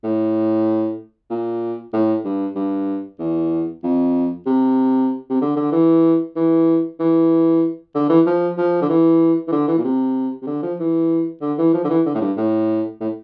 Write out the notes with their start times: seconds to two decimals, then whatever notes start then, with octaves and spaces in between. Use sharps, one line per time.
0.04 A2
1.30 A#2
1.93 A2
2.24 G2
2.56 G2
3.19 E2
3.83 F2
4.46 C3
5.30 C3
5.42 D3
5.56 D3
5.72 E3
6.36 E3
6.99 E3
7.95 D3
8.09 E3
8.26 F3
8.58 F3
8.82 D3
8.89 E3
9.48 E3
9.52 D3
9.68 E3
9.78 A#2
9.84 C3
10.42 C3
10.47 D3
10.63 F3
10.79 E3
11.42 D3
11.58 E3
11.74 F3
11.84 D3
11.90 E3
12.06 D3
12.15 A2
12.21 G2
12.37 A2
13.00 A2